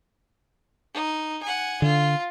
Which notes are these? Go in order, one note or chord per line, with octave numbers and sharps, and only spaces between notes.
D#4
F#5 G#5
D3 F4